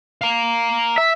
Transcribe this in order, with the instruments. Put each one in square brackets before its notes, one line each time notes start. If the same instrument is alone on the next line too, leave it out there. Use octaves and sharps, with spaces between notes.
[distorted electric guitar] F5 A#5
[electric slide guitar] E5